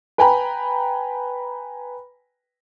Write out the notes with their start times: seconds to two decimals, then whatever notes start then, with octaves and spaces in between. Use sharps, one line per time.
0.18 B4 G5 G#5 A#5 B5